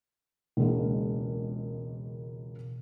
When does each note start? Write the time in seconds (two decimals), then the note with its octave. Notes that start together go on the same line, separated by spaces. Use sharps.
0.57 E1 C#2 G#3 A#3